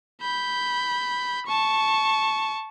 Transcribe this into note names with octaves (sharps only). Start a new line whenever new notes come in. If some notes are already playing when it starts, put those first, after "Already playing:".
B5 G6
A5 C#6